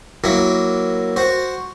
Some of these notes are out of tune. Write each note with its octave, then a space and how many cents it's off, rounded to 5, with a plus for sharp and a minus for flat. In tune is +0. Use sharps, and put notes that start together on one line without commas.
F#3 +0 A#3 +0 E4 +0
F#4 +0 C5 +0